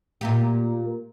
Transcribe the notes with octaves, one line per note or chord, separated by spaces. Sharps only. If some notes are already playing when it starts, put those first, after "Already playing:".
A#2 A#3 G4